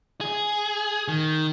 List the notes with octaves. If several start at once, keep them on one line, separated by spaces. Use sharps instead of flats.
G#4
D#3